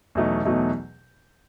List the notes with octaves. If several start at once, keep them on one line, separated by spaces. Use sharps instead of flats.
E2 B2 F#3 A3 D#4
E2 B2 F#3 A3 D#4